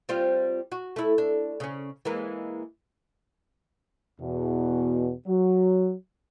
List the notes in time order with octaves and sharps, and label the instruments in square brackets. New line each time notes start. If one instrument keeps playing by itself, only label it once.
[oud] G3 C4 F4
F#4
A3 E4
D4
C#3 C#4
E3 G#3 A#3
[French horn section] E2 B2
F#3